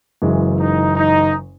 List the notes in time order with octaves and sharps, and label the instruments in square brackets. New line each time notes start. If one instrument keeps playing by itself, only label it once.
[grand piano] F#1 F#2 E3 G#3
[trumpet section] D#4
D#4